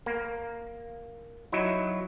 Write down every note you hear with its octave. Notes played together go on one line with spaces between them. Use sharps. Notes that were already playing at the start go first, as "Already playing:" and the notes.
A#3
F#3 D#4 E4